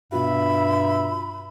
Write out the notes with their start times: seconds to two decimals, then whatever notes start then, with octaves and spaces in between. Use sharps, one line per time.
0.12 G2 B2 F4 F#4 E5 B5